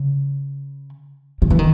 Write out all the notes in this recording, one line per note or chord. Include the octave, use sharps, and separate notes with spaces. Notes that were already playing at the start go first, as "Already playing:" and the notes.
Already playing: C#3
D#3
E3
D#3